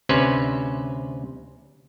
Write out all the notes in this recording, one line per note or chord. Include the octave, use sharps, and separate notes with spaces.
D2 C3 C#4 B4 C5